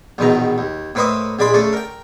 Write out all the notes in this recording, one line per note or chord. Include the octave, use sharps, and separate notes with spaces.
A#1 E2 B2 D#3 A#5
D#2
A2 A#3 B4 C5 D#5 E5
A#1 G#3 D5 B5 C6
C#3 A3 D4 A4
A#4 G5